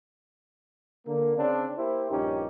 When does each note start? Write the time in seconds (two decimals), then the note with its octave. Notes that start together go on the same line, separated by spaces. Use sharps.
1.07 D3 A#3
1.38 C#3 C4 D4
1.78 A#3 E4 G4 C5
2.11 A#1 G2 C#4 D#4 G4